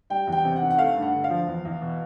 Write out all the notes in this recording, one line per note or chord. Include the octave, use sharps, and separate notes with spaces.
G3 G5
E2 G5
C3
F#5
D#3
F#5
A3 F5
G2
F#5
D3
F5
F3
E2
E2
B2